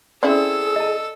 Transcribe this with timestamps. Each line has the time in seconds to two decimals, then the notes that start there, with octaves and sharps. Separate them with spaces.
0.23 C4 C#4 E4 G#4 A4 D5 E6
0.76 D#5 A5